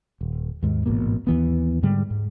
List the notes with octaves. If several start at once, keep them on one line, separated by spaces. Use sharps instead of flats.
D#1
D#2 G#2
A1 G#2 B2 A#3
D#2 E3 B3
G#2 D3 G3 G#3
G#2